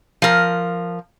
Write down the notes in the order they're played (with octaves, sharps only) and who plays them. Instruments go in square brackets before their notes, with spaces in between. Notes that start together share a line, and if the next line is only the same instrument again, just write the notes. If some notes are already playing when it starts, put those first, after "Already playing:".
[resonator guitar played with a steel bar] F3 A#4